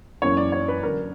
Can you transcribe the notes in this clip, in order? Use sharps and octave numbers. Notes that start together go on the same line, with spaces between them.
F#2 E3 A#3 C#5
D5
C#5
B4
F#2 D3 F#3 A#4